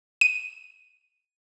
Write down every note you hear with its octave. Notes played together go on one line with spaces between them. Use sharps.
D#7